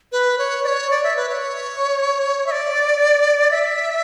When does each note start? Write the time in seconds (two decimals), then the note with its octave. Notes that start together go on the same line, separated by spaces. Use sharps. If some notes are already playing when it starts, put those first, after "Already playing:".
0.12 B4
0.38 C#5
0.64 D5
0.67 C#5
0.90 D5
1.04 E5
1.16 B4
1.29 C#5
2.47 E5
2.51 D5
3.51 E5